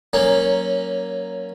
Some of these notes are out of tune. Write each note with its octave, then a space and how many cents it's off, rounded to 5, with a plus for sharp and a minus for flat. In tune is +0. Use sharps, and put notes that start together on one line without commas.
F#3 +10 A#3 +0 C#4 -5